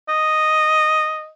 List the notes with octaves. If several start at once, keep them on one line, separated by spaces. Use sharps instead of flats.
D#5